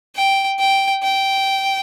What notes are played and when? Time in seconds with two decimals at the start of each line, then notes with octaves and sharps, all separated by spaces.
0.16 G5
0.59 G5
1.03 G5